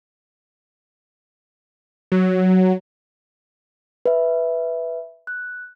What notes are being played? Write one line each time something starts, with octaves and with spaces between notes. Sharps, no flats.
F#3
B4 E5
F#6